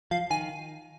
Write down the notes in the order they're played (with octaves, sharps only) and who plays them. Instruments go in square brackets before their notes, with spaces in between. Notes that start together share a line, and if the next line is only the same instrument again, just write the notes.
[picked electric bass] F3 [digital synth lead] F5
[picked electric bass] D#3 [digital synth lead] G#5